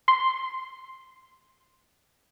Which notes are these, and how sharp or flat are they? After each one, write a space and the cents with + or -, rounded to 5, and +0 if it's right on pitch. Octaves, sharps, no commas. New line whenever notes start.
C6 +0